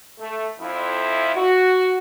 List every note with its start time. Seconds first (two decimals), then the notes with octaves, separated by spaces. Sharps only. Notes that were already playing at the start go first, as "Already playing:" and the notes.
0.19 A3
0.60 F2 E4
1.36 F#4